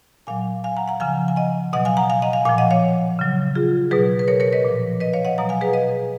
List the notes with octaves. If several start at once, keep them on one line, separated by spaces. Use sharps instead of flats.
A#2 F#3 F5 G#5
F5 G#5
F#5 A#5
F#5 A#5
C#3 F3 F5 G#5
G#5
D#5 F#5
B2 F#3 D#5 F#5
F5 G#5
F#5 A#5
F5 G#5
D#5 F#5
F5 G#5
A#2 F3 F5 G#5
D#5 F#5
C#5 F5
C#3 F#3
F4 G#4
B2 F#3 G#4 B4
B4
A#4 C#5
A#4 C#5
B4 D#5
A#2 F3
B4 D#5
C#5 F5
D#5 F#5
B2 F#3 F#5 A#5
F5 G#5
G#4 B4
B4 D#5